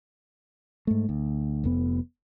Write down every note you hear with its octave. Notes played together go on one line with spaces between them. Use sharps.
G#2 A3
D2
F1 F2 B3